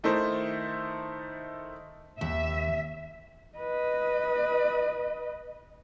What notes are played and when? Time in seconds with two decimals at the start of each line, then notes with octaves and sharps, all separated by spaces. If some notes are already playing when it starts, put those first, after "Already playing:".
0.04 D#3 A3 D#4 E4 A4 C5
2.21 D#2 E5
3.58 B4 D#5